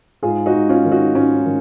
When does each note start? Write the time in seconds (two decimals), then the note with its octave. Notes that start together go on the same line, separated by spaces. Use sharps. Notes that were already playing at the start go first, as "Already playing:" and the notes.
0.23 G#2 F4 G#4
0.46 D#4 F#4
0.54 G#2
0.69 C#4 F4
0.84 D#3
0.92 D#4 F#4
1.15 G#2 C#4 F4
1.45 D#3